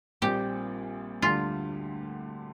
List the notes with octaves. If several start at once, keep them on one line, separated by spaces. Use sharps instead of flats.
A#1 A#2 G3 C4 G4
D2 D3 G3 F4